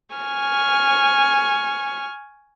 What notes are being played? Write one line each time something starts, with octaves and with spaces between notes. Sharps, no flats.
G#5 C#6 F6